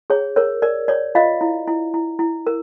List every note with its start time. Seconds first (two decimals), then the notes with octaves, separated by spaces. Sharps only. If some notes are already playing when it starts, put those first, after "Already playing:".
0.10 G#4 C#5
0.36 A#4 C#5
0.62 A#4 D5
0.88 C#5 D5
1.15 F4 D#5 F5
1.41 E4
1.68 E4
1.94 E4
2.19 E4
2.47 A#4